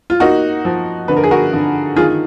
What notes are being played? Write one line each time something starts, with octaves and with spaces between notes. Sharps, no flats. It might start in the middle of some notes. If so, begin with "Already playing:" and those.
F4
A#3 D#4 F#4
F3
D3 B4
A#4
G#4
F#4 A#4
D3
D#3 F4 G#4